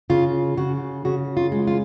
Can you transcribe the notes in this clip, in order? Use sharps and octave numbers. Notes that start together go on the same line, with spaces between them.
C#3 F4
C#3 F#4
C#3 F#4
F4
G#3
F4